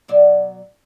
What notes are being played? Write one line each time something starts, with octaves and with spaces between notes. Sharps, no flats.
B2 F#3 D5